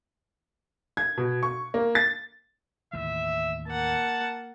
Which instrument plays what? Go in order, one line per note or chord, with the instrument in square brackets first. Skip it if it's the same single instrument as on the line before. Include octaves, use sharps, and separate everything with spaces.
[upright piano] G#6
B2
C#6
A#3
A6
[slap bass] D#2 A2 E3 [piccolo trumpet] E5
[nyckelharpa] A#3 F#5 [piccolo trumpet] A5